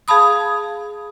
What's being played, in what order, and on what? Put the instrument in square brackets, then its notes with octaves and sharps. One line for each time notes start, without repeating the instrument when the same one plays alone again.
[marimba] G#4 F5 A5 B5 D#6